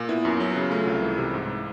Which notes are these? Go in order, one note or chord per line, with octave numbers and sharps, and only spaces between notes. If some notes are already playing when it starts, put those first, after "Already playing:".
Already playing: A#2
B3 E4
F#2
F#3
C#3
A3 F4
C2
E3
C3
G#2